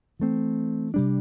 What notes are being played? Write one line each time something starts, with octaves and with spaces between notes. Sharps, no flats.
E3 A3 C4
C3 G3 D4